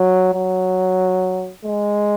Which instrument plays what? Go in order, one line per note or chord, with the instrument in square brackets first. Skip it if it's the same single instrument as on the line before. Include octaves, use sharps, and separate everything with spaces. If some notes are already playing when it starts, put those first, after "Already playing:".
Already playing: [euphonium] F#3
F#3
G#3